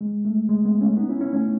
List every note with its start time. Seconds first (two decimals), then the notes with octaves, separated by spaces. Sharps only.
0.01 G#3
0.25 A3
0.49 G#3
0.65 G#3 B3
0.81 A3 C#4
0.97 B3 D#4
1.09 C#4 E4
1.21 C#4 E4
1.33 A3 C#4